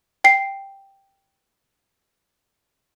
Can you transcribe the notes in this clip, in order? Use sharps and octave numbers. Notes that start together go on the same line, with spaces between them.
G5 C7